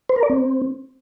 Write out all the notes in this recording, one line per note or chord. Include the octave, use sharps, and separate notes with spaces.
C5
A#4
D5
C4